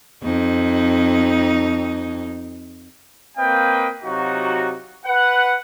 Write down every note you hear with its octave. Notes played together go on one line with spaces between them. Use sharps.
F2 D#4
A#3 C4 B4 D#5 F5 G5
C3 F#3 D#4 F4 F#4
B4 F#5